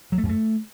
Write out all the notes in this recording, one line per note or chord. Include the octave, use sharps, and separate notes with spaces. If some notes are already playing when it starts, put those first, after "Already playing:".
F#3
A3
F#2
A3